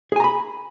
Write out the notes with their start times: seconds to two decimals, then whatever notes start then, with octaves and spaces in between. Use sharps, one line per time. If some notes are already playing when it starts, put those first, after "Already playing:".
0.12 G#4
0.16 G#5
0.20 A#5
0.24 B5